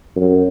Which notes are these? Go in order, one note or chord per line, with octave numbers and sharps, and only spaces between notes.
F#2